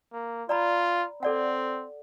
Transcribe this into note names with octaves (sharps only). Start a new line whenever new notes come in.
A#3
F4 D5 A#5 B5
C4 A4 D5 F#5